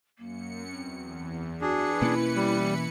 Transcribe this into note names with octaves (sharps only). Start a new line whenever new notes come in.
F#2 A#3 C#7
E2 C4
E3 D4 F#4 G#4 B4 C#7
B2 A#3 C#4 E4
G3